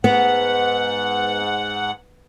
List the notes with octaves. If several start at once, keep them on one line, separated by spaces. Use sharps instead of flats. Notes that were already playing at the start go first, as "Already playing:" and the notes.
G#2 B3 F#5